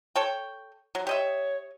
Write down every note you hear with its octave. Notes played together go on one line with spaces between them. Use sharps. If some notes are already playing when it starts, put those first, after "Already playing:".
A4 C#5 G5
F#3
G4 C#5 D#5 E5